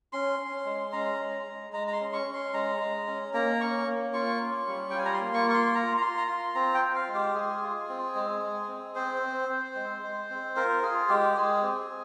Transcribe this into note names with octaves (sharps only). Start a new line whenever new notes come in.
C#4 C6
C#4
G#3
C#4 A#5
G#3
G#3
G#3 A#5
A#5
C6
C#4
C#6
C#4
C6
G#3 A#5
G#3
C#4
A#3 A#5
C#4 C#6
A#3
F4 C#6
C#4
G3
G5
F4 G#5
A#5
C6
A#3
C#6
F4 C#6
C6
F4 A#5
A#5
F4 C6
A#5
F4 C6
C4 A#5
G5
F4
F5
G#3
G4
G#3 G#4
F4
C4
G#3
G#3
C4
C4 C5
C4
C4
G#3
G#3
C4
F4 A#4
F4 G#4
G#3 G4
G#3 G#4
C4